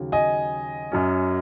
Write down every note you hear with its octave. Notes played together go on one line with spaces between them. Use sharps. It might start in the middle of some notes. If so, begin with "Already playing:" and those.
Already playing: D#2 C#3 F#3
D#5 G#5
F#2 F#3 C#4